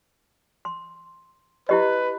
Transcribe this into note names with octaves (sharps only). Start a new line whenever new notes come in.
C6
E4 G4 B4 D#5